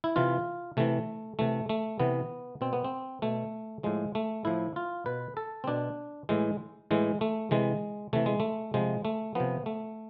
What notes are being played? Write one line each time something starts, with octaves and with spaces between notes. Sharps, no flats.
E4
C3 E3 F4
C3 E3 A3
C3 E3 A3
A3
C3 E3 B3
B2 C4
B3
C4
B2 A3
A2 F3 G#3
A3
A2 F3 E4
F4
B2 B4
A4
C4
B2 D4
A2 E3 G#3
A2 E3 G#3
A3
C3 E3 G#3
C3 E3 A3
G#3
A3
C3 F3 G#3
A3
C3 F3 B3
A3